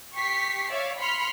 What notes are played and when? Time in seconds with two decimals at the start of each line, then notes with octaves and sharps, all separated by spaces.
0.14 G4 C#6 B6 C7
0.70 C#5 D5 E5 F5
0.98 B5 C6 F6 C#7